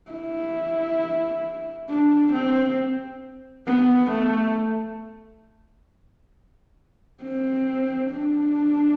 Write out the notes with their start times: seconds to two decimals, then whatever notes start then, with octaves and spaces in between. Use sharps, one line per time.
0.11 E4
1.89 D4
2.34 C4
3.67 B3
4.11 A3
7.23 C4
8.12 D4